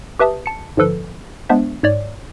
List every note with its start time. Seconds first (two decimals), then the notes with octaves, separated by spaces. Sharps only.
0.19 G4 B4 E5 A5 D#6
0.46 A5 C#7
0.77 G#2 D3 F3 A4 B4
1.49 G#3 B3 D4 C5 E5
1.83 G#2 C#5 D5